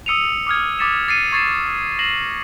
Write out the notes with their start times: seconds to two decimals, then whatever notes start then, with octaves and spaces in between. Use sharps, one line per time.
0.06 D#6 E6 C#7 D#7 F7
0.47 D6 D#6 F6 G#6
0.79 D6 D#6 A6 B6 C#7 E7
1.08 D6 A6 C7 C#7 D#7
1.32 C#6 G#6 A6 C7 D#7 E7
1.99 E6 A6 A#6 C7 E7 F#7